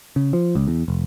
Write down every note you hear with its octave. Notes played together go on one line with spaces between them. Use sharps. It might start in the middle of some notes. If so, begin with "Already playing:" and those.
C#3
F3
C#2
E2
F1